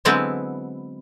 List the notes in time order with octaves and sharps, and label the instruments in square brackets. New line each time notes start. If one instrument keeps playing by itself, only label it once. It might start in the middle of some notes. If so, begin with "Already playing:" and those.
[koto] D3 F#3 G#3 B3 C4 E4